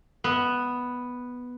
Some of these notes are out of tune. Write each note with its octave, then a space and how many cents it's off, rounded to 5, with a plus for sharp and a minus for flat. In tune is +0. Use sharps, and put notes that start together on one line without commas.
B3 +0 E5 -35